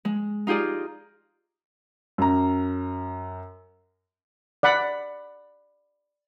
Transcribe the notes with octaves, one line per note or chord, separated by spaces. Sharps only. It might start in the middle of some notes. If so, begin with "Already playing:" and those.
G#3
D#4 F4 G4 G#4 D5
F#2 A#5
D5 F#5 B5